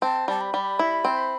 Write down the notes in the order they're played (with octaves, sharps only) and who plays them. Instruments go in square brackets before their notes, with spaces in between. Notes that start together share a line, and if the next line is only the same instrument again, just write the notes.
[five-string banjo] C4 [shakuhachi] A5
[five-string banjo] G3 [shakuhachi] A5
[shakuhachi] B5
[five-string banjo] G3
E4
C4